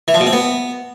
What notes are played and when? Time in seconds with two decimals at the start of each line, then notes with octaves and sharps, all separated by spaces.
0.08 E3
0.14 F3
0.20 B2
0.27 C4
0.33 B3